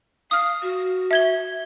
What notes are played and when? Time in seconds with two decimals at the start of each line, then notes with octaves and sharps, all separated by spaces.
0.31 F5 D#6 F6
0.62 F#4
1.11 E5 G#6 G7